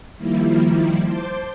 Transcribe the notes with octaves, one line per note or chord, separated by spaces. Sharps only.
D#3 F3 G3 A#3 E4
C5 A5 D6 G6